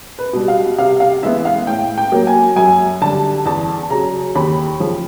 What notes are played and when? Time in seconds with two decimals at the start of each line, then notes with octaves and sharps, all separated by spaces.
0.19 B4
0.33 B2 G3
0.48 F5
0.78 C3 F5
1.00 F5
1.22 E3 G#3 B3 E5
1.45 F5
1.67 A2 G5
1.98 G5
2.12 F#3 A#3
2.27 G#5
2.56 F#2 G#5
3.01 D3 G3 A5
3.45 E2 A5
3.90 C#3 F#3 A#5
4.35 D#2 B5
4.80 C#3 F3